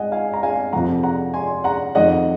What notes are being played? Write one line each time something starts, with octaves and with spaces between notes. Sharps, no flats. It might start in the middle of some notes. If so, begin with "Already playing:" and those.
Already playing: G#2 D#5 F#5 G#5
F5 G#5
A#5
F5 G#5
F2 C3 F3 F#5 A#5
F#5 A#5
G#5 C6
F#5 A#5
F2 D#3 D#5 F#5